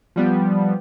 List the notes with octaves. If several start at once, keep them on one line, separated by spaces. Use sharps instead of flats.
F3 G3 B3